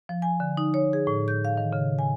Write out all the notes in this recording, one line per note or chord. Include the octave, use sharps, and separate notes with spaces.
F3
G#5
D3
D#4
C#5
G#4
A2
G6
F5
D#3
C#3
G#5